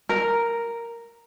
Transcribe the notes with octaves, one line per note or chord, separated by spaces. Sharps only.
A#4